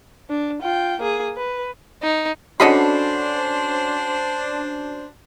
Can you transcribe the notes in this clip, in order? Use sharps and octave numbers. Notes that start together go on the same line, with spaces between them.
D4
F4 G5
A#3 G#4
B4
D#4
D3 C#4 D4 F#4 C5 D#5 B5 C7